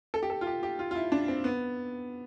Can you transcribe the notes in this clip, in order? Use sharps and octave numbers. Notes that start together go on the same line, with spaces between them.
A4
G4
A4
F4
G4
G4
F4
F4
E4
D4
C4
B3